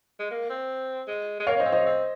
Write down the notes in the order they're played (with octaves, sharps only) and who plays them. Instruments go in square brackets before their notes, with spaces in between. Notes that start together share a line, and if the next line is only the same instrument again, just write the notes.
[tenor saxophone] G#3
A#3
C4
G#3
G#3
[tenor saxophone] A#3 [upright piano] C#5 F5
[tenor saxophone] C#4 [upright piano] C5 D#5
[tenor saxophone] C4
[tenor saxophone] C#4 [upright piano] C5 D#5
[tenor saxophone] C4